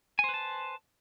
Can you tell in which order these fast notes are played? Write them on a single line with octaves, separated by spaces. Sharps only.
G#5 C5 B4 A5